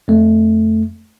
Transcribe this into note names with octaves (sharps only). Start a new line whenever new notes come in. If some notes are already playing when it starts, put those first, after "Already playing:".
F2 A3